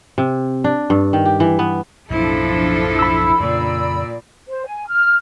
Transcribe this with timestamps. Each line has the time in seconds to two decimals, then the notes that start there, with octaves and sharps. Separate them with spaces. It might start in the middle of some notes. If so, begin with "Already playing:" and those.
0.18 C3
0.64 D4
0.90 G2
1.13 D#3
1.25 G4
1.40 E3
1.59 B3
2.10 B1 F#2 A2 F3 D4 E4 A4
2.99 B5 E6
3.40 F2 A#2 C#3 D5
4.48 C5
4.65 G#5
4.88 F6